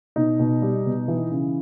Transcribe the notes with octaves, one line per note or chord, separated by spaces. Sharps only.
B2 D#4
B2
G3
B2
E3
C#3